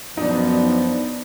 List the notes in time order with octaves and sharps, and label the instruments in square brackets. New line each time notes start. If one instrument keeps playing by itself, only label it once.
[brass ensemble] F#2 F3 [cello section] B3 [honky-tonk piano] D4 D#4